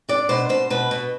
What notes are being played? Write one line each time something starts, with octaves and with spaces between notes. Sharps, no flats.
D4 D5
B2 C5
B2 C5
B2 B4
B2